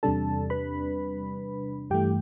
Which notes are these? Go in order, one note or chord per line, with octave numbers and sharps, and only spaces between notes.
E2 C3 G3 D4 A4 A5
B4 B5
G2 E3 A3 G4 G5